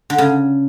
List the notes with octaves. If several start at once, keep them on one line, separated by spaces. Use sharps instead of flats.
D3
C#3